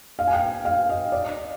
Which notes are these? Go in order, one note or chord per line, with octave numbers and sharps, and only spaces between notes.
F5
G#5
G5
F5
D#5
D5